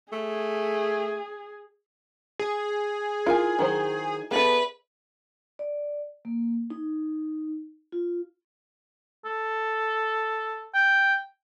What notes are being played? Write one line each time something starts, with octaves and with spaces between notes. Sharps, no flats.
A3 G#4
G#4
E4 F4 A#4 G#5
D#3 F#3 C5
B3 G#4 A4 B4 D5 E5
D5
A#3
D#4
F4
A4
G5